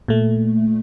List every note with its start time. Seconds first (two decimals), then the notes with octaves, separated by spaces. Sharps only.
0.08 A#2 A3